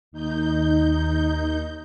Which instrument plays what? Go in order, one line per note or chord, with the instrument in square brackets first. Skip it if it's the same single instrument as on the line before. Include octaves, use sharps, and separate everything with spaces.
[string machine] D#2 D#4 G6